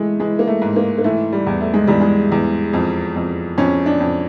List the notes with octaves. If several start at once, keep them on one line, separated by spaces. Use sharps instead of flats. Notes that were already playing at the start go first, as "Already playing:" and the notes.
Already playing: E3 G#3 A3
E3 G#3
A#3
A3
G#2
A#3
A#3
E3 A3
G3
E2
A3
G#3
E2 G3
G#3
E2
F2
F2
F2 C#4
D4
F2